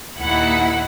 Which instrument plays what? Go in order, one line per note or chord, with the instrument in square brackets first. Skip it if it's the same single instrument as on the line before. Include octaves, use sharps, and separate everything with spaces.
[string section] D#2 A#2 D#3 E4 F#5